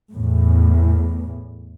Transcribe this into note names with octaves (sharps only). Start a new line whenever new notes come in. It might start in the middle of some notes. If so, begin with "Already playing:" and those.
E2 A2